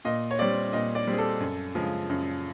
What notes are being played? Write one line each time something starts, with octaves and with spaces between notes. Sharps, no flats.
A#2 D#5
C#5
G3 C4 D5
A#2 D#5
D5
G3 C4
G#4
A4
F#2
C#3 F3 G#3
F#2